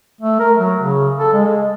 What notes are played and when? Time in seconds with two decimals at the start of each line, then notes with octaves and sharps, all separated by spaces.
0.21 A3
0.40 A#4
0.58 F#3
0.80 C#3
1.19 A4
1.33 G#3